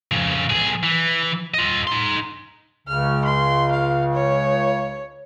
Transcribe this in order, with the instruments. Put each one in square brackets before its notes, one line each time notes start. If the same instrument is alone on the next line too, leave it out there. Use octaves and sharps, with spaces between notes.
[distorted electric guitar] F2 C#3
B1 G#4
E3
F4 D#5
D#4 C6
[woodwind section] C#2 C#3 [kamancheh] F6
[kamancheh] C6
F5
C#5